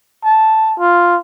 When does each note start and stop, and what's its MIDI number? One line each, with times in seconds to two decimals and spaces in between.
0.25 0.73 81
0.79 1.17 65